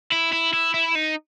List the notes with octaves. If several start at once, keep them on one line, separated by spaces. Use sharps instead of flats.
E4
E4
E4
E4
D#4